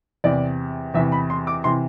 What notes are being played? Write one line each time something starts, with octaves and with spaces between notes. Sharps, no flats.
E2 C3 E3 D5
E2 C3 E3 E5
B5
C6
D6
C3 E3 C6